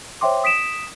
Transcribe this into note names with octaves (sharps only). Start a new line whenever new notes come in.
C5 C#5 E5 G5 C6 D6
D#6 B6 D7 E7